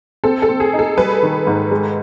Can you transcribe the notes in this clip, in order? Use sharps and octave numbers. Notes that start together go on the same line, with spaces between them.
C4 A4
A4
C4
G#4
D#4
A4
G3 B4
D#3
G#2
G#3